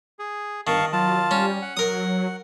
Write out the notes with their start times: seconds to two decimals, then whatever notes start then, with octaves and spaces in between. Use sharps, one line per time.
0.19 G#4
0.67 G1 D#3 F5 A5 C#6
0.93 F#3 F4 A5
1.31 G3 C#4
1.62 F#5
1.77 F#3 A#4 D#6